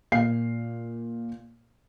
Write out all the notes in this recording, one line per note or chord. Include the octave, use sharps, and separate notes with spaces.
A#2 F5 C7